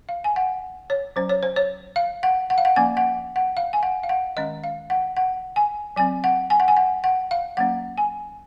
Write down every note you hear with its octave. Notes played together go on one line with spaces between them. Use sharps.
F5
G#5
F#5
C#5
F#3 C#4 C5
C#5
C5
C#5
F5
F#5
F#5
F5
F#5
F3 A#3 C#4 G#5
F#5
F#5
F5
G#5
F#5
F5
F#5
D#3 G#3 C#4 D#5
F5
F#5
F#5
G#5
F#3 C4 G#5
F#5
G#5
F#5
G#5
F#5
F#5
F5
F#3 A#3 C#4 F#5
G#5